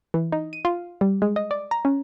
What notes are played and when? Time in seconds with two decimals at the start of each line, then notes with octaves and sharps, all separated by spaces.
0.14 E3
0.32 D#4
0.53 D#7
0.65 F4
1.01 G3
1.22 G#3
1.36 D#5
1.51 D5
1.71 A#5
1.85 C#4